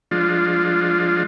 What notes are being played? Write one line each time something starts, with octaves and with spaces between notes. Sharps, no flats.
F3 G#3 D4 F4